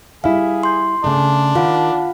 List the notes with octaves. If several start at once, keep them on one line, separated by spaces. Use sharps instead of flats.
G3 E4 G#4 F5
C6 G6
C#3 A3 D4
D#3 F4 F5 F#5